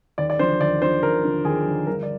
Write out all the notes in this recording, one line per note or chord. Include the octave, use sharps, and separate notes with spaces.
D#2 D5
D5
D3 F3 C5
D#2 D5
D3 F3 C5
D#2 A#4
D3 F3
D#2 G#4
D3 F3
G1 A#4
D5